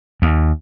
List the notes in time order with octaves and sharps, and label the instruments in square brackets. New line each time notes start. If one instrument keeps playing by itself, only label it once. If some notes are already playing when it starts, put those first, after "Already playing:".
[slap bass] D#2